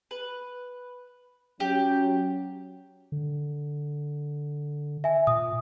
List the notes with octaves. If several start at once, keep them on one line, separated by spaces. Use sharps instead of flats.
B4
F#3 C#4 G4
D3
E5 G#5
A#2 D#6